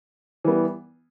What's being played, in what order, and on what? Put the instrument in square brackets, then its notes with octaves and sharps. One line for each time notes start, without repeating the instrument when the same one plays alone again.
[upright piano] E3 G3 B3